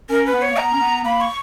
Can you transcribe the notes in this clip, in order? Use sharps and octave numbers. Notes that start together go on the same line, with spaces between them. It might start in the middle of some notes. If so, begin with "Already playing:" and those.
C#4 A#4
B4
B3
C#5
A#3
B3 A#5
C#4
B3
A#3 B5
C#6